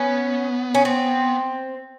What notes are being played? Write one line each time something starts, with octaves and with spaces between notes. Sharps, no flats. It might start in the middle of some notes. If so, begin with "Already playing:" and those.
Already playing: B3 C#4
C#4
C4